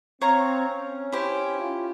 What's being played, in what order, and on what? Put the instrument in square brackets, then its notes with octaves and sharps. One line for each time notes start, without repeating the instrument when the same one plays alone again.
[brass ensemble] C4 [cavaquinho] C#5 F5 A#5 C#6
[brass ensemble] C#4
[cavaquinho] E4 G4 C5
[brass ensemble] F4